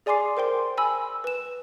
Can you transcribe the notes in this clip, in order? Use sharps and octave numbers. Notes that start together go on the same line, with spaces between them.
G#4 D5 G#5 C6 D6 C7
A#4 C5 G5 C6
G#5 B5 E6
B4 E7